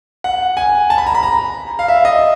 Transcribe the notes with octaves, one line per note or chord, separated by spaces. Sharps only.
F#5
G#5
A5
B5
A#5
B5
A#5
F5
E5
D#5